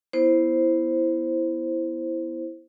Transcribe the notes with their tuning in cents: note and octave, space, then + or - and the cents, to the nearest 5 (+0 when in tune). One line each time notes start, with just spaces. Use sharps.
B3 +0 E4 +0 C5 +0